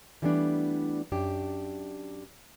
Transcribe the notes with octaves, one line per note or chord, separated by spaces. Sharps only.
E3 G3 A3 B3 C#4 D4
F#2 D4 G4